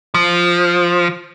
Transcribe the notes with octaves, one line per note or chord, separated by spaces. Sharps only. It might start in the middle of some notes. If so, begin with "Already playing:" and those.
F3